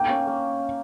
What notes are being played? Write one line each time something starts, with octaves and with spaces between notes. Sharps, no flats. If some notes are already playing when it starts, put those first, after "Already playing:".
Already playing: A#3 G5
C#4
A#3